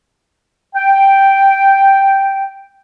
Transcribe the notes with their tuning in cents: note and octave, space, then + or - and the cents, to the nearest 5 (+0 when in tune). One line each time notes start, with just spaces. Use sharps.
G5 -5